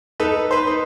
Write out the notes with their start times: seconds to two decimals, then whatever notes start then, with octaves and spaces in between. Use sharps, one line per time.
0.20 D#4 A4 B4
0.51 B4 C5
0.67 D#4